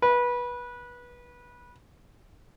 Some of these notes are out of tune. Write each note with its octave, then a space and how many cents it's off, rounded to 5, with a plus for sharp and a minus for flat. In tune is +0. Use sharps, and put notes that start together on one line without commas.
B4 -20